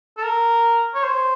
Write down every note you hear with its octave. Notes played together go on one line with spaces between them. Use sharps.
A4
A#4
C#5
C5